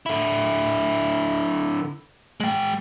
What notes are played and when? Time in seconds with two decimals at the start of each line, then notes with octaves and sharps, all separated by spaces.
0.06 D3 E4
2.40 G#3 G5